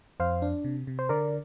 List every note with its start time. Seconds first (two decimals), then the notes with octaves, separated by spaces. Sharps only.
0.20 F2 C5 F5
0.42 D4
0.64 C3
0.87 C3
0.99 C5
1.09 D3 A#4 D5